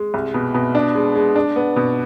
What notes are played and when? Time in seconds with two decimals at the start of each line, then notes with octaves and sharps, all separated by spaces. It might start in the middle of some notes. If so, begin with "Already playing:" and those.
Already playing: G#3
0.14 C2
0.34 B2
0.54 B2
0.75 D4
0.95 G#3
1.15 G#3
1.36 D4
1.56 B3
1.76 B2